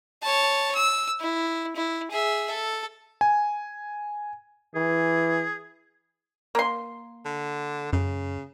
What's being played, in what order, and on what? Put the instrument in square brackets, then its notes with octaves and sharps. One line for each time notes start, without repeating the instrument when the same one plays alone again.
[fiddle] C#5 A5
E6
E4
E4
G#4 E5
A4
[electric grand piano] G#5
[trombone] E3 [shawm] G#4
[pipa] A#3 C6
[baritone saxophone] D3
[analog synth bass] F#2 [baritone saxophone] C#3